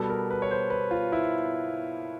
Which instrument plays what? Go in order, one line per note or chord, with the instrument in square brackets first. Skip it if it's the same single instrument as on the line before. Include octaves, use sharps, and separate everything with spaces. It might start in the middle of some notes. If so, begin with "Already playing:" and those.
Already playing: [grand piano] B2 G3 B3 A4
A#4
B4
C#5
C5
B4
F4
E4